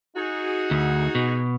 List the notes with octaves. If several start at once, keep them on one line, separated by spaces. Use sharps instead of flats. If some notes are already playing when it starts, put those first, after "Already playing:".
D#4 F#4 G#4
D2
B2